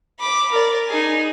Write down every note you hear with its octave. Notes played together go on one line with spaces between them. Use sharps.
B5 D6
A#4 D5
D#4 G#4